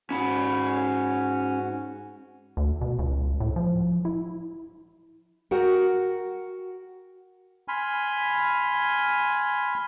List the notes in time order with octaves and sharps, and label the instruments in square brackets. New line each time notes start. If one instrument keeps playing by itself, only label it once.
[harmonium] G#2 F#4 [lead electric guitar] C#4 B5
[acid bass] D2
B2
C#2
A2
F3
E4
[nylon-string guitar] F#4 A#4 F#5 G5
[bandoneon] G#5 B5 C6 F6